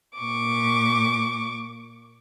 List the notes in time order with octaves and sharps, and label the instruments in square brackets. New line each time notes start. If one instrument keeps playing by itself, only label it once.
[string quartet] A#2 C#6 D6